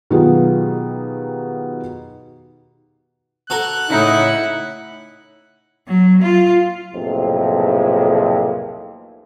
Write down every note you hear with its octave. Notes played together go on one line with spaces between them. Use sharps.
B2 D#3 F#3 F4 G4 G#4
F#4 A4 A#4 F#6
A2 C#3 D#4 E4 F#5
F#3
F4
B1 F2 A2 C3 A#3 G#4